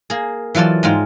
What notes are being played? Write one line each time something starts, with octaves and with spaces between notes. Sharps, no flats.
A#3 G#4
E3 F#3 F4 A4 D5
G#2 G#3 F4 G5